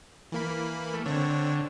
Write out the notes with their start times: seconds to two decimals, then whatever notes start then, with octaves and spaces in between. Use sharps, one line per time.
0.32 E3 A#3 B5
0.93 A3
1.06 D3 C4 C#5